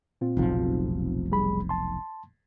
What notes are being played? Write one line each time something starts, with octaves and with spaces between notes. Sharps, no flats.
A#2 C4 F4
F1 B1 F3
G3 G#4 B5
A5 C6